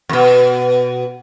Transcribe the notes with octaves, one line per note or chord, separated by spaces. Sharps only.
F2 B2